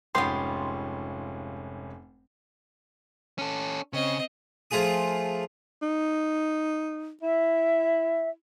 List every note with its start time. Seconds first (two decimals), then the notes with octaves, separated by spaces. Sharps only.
0.15 F1 G#2 B3 C#4 F4 G4 C6
3.38 C#4 A4
3.93 C#3 C4 D#5
4.71 F3 A3 F4 G#4 D#6
5.82 D#4
7.22 E4 E5